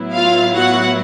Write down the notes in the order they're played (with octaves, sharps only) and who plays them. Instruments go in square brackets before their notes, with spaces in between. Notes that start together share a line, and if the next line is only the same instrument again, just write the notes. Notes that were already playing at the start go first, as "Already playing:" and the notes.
Already playing: [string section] A2 F#3 B3 E4
F4 F5
F#4 F#5